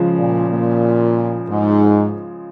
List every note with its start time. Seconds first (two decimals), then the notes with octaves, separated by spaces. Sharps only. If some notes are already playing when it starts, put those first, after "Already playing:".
Already playing: C#3 F3 G#3
0.18 A#2
0.50 A#2
1.49 G#2